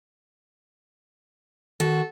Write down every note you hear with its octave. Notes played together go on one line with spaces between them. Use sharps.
D#3 F#4 A4